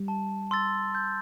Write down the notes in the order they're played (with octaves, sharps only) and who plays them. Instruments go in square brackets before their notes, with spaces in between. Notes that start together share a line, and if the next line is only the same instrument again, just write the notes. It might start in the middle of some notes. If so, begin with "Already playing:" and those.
Already playing: [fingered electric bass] G3
[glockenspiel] A5
C6 E6 A6
G6